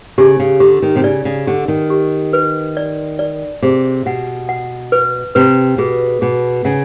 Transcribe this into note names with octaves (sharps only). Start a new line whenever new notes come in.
C#3 G4
C#3
D3 G4
D#3
C3
C#3 D5
C#3
D3 G4
D#3
G4
B4
D5
D5
C3 G#4
B2 F#5
F#5
B4
C3 B4
B2 G#4
B2 G#4
C#3 F#5